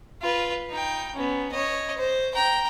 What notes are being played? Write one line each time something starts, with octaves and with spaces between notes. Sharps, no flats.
F4 B4
D#4 G5
B3 C#4
C#5 D#5
C5
G5 A#5